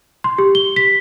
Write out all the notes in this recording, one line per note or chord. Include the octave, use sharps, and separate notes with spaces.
C6
G4
G7
B6